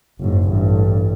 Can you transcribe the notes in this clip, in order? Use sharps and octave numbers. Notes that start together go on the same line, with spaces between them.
F#1 G#2
A1 G2